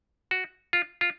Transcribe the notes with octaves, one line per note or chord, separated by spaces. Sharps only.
F#4
F4
F4